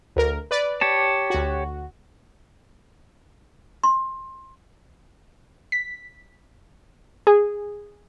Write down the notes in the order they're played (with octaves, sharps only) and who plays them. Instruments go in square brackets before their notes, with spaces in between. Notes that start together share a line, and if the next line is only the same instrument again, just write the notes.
[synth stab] D2 A#4
B4 D5
[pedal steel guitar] G4 C#5 A5
[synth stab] D2 F#4
[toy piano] C6
[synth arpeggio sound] B6
G#4